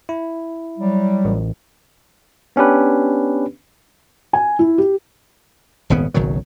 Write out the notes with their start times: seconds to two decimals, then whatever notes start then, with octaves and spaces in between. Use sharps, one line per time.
0.09 E4
0.78 F#3 G3
1.25 A1
2.56 B3 C#4 D4 G4 B4
4.33 G#5
4.59 E4
4.78 G4
5.90 D#1 G#1 C#3 B3
6.14 F#1 B1 D#3 F#3